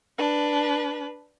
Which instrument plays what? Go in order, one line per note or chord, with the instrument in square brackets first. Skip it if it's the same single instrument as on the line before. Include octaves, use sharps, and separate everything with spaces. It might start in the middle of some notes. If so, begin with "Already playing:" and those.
[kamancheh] D4 B4